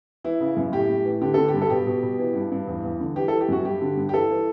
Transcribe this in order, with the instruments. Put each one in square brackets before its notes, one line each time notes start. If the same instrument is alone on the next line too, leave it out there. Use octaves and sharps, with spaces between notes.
[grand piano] E3 E4
C#3
F#2
A2 G4
A2
E3
D3 G4
D3 A4
G4
G2
A4
B2 G4
B2
B2
E3
G2
G2
E2
E2
D3
E3 G4
A4
E3
G4
F#2 F#4
G2 G4
D3
G2
G4
E3 A4
E3